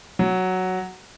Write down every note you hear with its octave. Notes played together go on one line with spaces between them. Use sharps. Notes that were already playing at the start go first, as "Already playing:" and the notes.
F#3